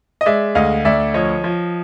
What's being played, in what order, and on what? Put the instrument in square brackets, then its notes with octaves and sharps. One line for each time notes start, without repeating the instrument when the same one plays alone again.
[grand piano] D#5
G#3 D5 E5
D2 D#5 F5
D2 D5 E5
F3 C#5 D#5
F3